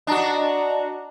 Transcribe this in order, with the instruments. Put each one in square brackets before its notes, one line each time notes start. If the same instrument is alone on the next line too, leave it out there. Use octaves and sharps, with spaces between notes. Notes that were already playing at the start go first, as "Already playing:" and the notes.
[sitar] D4 F#4 [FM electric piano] D#5 A5 A#5